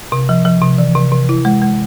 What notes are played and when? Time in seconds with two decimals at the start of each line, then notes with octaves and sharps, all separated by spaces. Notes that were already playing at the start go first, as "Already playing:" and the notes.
0.12 C3
0.29 F3
0.45 F3
0.62 C3
0.78 E3
0.95 C3
1.12 C3
1.29 E4
1.45 G#3
1.62 G#3